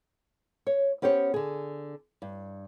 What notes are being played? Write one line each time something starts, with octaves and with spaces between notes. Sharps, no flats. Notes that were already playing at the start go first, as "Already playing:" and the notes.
C#5
B3 C#4 G4 C5 C#5
D3 G#4
G2